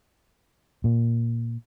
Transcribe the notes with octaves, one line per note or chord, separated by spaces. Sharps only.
A#2